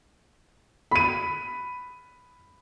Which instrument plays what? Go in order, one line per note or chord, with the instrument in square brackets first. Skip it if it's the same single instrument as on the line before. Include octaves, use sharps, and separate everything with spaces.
[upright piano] B5 D#7